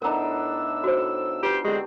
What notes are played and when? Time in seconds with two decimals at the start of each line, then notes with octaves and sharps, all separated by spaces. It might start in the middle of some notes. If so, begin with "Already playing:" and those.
0.02 A2 B3 D4 D#4 A#4 A#5 E6
0.84 F#4 C5
1.43 F4 G4 B4 C5
1.65 D3 G#3 C4 C#4 G4